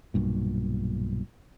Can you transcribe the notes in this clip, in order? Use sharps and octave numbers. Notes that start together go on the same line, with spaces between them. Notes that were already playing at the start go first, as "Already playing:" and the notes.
B1 G2 A#2